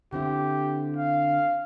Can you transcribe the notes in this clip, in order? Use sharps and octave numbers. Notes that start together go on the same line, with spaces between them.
D3 C4 E4 G4
F5